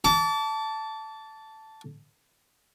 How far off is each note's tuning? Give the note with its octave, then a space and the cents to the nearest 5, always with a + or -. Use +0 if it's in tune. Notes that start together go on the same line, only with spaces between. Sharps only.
A5 +0 D6 -40